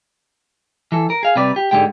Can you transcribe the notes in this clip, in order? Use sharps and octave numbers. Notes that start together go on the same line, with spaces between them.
E3 A4
A#4
G#4 F5
C3 G3 B4 D5
G4
G#2 D3 F3 G#3 G4 G5